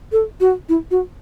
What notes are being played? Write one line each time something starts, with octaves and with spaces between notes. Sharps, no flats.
A4
F#4
E4
F#4